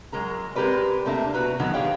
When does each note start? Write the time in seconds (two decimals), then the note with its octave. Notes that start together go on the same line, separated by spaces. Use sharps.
0.12 F#3 G#3 A#4 A#5
0.55 G#3 C4 G4 A#4 B4 D5
1.05 C3 A3 A#3 D4 E5
1.34 B2 F#4 B4 A#5
1.59 B2 D3 D#3 F#3 B3
1.74 G4 G#4 C#5 D5 F5 G5